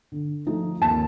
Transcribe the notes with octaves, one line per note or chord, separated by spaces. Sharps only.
D3
F3 A3 D#4
D#2 A5